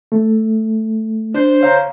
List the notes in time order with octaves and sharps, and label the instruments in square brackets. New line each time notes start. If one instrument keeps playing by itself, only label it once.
[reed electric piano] A3
[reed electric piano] D4 [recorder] C5
[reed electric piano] C#5 F5 A#5